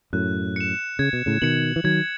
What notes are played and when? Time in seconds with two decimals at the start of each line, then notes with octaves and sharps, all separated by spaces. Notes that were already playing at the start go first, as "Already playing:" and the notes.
0.13 F#2 A2 F#6
0.56 C#7 E7
0.99 C#3 G#6
1.13 B2
1.26 A2 C#3
1.42 B2 D#3 C#7 F#7
1.76 E3
1.84 D#3 F#3 G#6